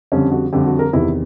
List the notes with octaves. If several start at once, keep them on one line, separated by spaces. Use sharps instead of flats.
F2 D3 G3 C#4
F#4
F2 D3 G3 G4
F#4
A#4
E2 C3 D#3 E4